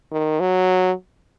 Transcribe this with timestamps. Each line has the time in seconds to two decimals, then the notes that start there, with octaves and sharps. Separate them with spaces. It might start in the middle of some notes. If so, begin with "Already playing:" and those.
0.12 D#3
0.40 F#3